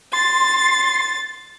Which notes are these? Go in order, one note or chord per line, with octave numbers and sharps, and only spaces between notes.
C6 A6